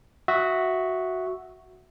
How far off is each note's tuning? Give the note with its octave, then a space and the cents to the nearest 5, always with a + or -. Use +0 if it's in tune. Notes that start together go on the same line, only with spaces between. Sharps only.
F#4 +0 E5 +0 D#6 +40